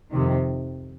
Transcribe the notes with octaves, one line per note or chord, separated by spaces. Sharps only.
F2 C3 D#3